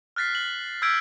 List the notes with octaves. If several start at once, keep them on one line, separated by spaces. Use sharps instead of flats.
F6 F#6 A6 B6 C7
F#7
E6 F6 G6 G#6 B6 D7